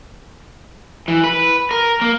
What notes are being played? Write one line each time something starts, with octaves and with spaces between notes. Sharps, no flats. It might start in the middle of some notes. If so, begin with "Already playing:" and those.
E3
B4
A#4
A#3